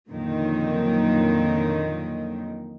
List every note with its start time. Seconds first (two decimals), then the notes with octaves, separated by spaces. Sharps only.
0.10 F2 A#2 D3 D#3 F3 F#3